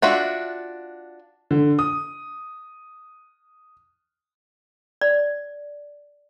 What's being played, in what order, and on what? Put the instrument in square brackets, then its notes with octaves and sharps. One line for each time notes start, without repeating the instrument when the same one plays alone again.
[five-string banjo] D4 F4 F#4 E5
[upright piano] D3
D#6
[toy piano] D5